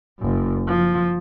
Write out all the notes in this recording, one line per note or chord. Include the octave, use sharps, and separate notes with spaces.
F#1 F#2
F3